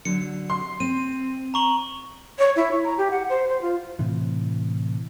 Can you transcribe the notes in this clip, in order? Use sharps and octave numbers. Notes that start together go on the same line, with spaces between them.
D3 F#3 C#7
C6
C4 D#7
A#5 C#6 F#7
C#5
E4
C#6
A#5
G4
F#5
C5
C5
F4
A2 C3 E3